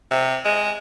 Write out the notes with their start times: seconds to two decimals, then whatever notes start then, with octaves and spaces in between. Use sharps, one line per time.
0.11 C3
0.45 G#3